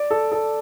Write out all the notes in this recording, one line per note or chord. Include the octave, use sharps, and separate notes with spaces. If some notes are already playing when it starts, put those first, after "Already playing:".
Already playing: D5
A4
A4